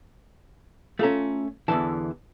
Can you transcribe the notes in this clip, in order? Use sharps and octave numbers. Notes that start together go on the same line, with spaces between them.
A3 C#4 F4 A4 A#5
E2 D3 E3 A5